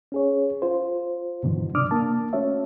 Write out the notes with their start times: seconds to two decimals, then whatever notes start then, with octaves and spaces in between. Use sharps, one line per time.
0.12 C#4 G#4 C#5
0.62 F4 C5
1.43 G2 B2 D3 E3 F#3
1.75 C3 D4 D6 D#6 F6
1.91 A#3 D4 A5
2.33 A3 C#4 F#4 C#5 E5